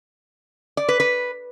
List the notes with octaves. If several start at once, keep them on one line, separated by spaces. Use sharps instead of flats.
D5
B4
B4